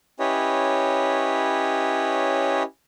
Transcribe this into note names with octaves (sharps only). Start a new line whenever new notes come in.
C#4 E4 G4 B4 C#5 D#5